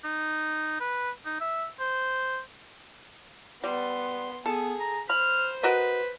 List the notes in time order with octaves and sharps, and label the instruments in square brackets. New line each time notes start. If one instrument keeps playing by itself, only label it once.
[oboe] D#4
B4
D#4
E5
C5
[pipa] G3 [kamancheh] B3 C6
[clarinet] B3 [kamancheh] G#4 [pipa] A4
[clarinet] A#5
[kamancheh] C5 [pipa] B5 [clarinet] F6
[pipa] F#4 A#4 D#5 [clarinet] B4